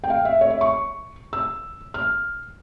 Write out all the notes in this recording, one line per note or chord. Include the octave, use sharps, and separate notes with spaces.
G5
F5
E5
C#5
E5
C#6
E6
F6